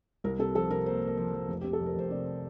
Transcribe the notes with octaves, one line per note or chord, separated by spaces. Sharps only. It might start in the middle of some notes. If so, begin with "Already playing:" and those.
C2 A#4
C3 A4
F3 A4
C3 A#4
A#3 C5
A#3
A#4
F3
F3
F1
C3 G4
A4
F2
A#4
F1 C5
C3 D5